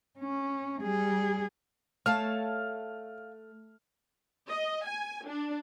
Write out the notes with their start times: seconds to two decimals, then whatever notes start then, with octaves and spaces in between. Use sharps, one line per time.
0.19 C#4
0.82 G3 G#4
2.06 A3 C#5 F5 A5 F6
4.48 D#5
4.86 G#5
5.26 D4